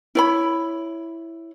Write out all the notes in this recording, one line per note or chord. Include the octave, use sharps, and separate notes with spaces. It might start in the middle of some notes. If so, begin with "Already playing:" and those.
E4 C#5 B5